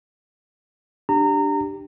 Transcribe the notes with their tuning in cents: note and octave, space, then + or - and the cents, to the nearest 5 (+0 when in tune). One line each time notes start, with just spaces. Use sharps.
D4 +5 G4 +0 A#5 -25